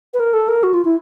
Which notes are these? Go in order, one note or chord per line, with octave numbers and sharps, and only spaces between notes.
B4
A#4
A4
A#4
F#4
F4
E4